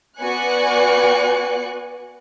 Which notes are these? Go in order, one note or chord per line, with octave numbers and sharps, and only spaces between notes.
B3 F#4 D5 G#5 F#6 C#7